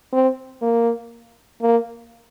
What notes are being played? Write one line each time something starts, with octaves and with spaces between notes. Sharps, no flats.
C4
A#3
A#3